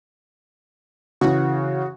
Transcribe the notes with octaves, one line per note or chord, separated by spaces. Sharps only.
C#3 E3 F#4